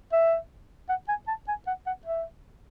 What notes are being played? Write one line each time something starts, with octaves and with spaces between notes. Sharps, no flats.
E5
F#5
G#5
A5
G#5
F#5
F#5
E5